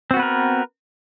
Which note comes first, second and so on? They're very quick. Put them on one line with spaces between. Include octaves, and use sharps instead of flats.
C4 F#4 B3 B4 A#4